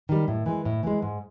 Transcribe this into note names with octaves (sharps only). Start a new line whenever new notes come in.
D#3 G3
A2
E3 G#3
A2
E3 G#3
G#2